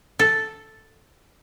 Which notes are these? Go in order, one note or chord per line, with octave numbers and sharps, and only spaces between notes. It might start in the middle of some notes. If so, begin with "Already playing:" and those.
A4